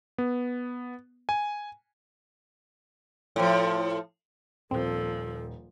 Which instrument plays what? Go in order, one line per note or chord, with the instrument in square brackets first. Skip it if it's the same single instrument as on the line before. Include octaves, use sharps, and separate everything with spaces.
[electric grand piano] B3
G#5
[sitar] A2 F3
[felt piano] D#1 [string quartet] A#2 F3 [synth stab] C4 [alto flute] A4